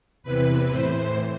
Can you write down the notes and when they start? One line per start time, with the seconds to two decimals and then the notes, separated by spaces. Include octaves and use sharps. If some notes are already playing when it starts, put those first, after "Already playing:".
0.23 E2 C3 E3 B4
0.70 A2 E3 C5